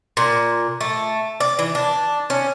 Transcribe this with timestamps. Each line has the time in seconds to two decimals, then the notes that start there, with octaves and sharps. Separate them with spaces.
0.17 A#2
0.81 A3
1.40 D5
1.59 E3
1.75 D4
2.30 C#4